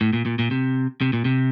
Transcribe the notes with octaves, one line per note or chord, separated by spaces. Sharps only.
A2
A#2
A#2
A#2
C3
C3
A#2
C3